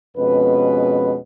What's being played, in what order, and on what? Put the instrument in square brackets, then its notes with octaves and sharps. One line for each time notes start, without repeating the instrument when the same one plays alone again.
[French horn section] F2 B2 G#3 C#4 B4